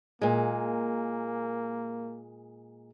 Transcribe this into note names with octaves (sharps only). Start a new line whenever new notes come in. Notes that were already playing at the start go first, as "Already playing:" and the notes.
A#2 G#3 A#3